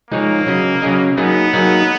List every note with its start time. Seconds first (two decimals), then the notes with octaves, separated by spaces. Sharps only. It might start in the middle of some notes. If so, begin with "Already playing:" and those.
0.11 F3 G#3 A#3 D#4 G#4 C#5
0.47 C#3 F#3 C#4 G#4 D#5
0.82 C#3 F#3 C#4 G#4 D#5
1.17 F#3 A#3 B3 D#4 G#4
1.53 F#3 A#3 D#4 G#4